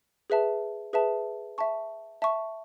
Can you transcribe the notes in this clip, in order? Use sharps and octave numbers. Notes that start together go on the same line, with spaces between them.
G#4 B4 E5 A5
G#4 B4 E5 A5
E5 A5 C#6
E5 A5 C#6